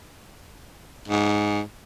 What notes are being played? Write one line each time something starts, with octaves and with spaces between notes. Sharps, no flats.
G#2